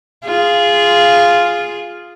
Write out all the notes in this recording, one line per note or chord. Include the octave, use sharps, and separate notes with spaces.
F4 G#4